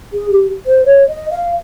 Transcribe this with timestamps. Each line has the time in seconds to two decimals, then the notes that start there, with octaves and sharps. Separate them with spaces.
0.13 G#4
0.30 G4
0.66 C5
0.84 C#5
1.08 D#5
1.31 F5